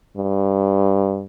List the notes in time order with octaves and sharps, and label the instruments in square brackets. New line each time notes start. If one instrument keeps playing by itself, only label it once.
[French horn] G2